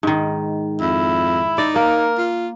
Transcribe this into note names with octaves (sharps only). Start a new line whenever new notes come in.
G#2 D#3
F2 E4
D#4 D5
A#3 A#4
F4